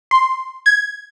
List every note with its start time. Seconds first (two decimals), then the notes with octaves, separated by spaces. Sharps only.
0.11 C6
0.66 G#6